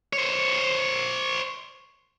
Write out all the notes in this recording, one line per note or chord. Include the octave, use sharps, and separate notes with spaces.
C5 C#5